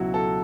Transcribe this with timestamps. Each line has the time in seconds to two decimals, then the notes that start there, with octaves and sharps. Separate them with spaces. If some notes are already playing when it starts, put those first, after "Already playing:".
Already playing: C#2 B2 F#3 E4 F#4
0.14 A4